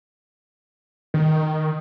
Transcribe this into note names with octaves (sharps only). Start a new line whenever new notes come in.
D#3